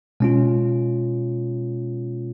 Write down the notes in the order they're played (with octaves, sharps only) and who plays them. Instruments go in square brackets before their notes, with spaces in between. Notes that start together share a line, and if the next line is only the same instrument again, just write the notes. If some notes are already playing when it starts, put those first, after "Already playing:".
[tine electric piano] B2 G#3 C#4 F4